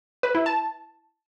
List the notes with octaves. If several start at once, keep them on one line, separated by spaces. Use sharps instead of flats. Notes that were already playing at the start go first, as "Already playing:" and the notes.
B4
E4
A5